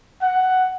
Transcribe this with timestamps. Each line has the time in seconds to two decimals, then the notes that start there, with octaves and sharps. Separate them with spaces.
0.22 F#5